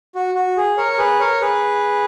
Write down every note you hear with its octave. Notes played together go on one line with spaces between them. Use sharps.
F#4
F#4
G#4
A#4 C#5
A#4
G#4 B4
A#4 C#5
G#4 B4